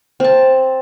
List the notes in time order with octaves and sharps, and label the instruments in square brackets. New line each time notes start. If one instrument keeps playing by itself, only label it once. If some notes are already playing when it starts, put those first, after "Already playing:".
[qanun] C4 A5